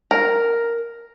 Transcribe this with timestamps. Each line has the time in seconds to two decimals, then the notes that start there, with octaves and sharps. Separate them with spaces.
0.11 A#4